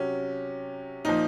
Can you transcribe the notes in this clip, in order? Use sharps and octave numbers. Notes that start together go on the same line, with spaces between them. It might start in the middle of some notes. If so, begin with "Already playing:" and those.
Already playing: C3 F#3 C#4
A#2 F3 D#4